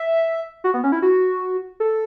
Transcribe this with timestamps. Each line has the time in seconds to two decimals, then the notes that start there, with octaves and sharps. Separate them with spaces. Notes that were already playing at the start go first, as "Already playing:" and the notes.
Already playing: E5
0.64 F#4
0.74 B3
0.84 C#4
0.92 E4
1.02 F#4
1.80 A4